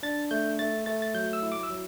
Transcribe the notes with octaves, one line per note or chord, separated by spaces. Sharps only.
D4 A6
A3 G6
A3 A6
A3 A6
A6
F#3 G6
E6
E4
D6
E6
F#3